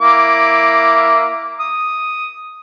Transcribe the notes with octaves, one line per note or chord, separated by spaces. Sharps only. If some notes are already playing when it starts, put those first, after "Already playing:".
A#3 E4 D6
D#6